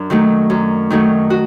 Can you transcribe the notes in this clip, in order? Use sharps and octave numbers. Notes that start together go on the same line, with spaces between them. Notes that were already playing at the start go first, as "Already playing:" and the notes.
Already playing: F#2 D4
D#3 F#3 A3
F#2
D#3 F#3 A3
F#4